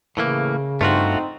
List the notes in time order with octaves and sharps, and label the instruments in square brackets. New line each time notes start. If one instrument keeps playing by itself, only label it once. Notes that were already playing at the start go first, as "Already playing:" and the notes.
[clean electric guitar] A2 E3 A#3 [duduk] C#3
[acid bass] G2 [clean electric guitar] A3 F4 F#4 [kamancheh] C4 D#4